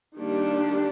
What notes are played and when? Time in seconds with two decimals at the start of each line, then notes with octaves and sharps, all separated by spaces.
0.15 D#3 G3 A#3 D4 G4